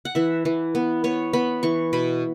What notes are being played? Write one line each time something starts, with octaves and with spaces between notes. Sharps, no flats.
F#5
E3 E5
E3
B3
B3 C#5
B3 B5
E3 C#6
B2 B5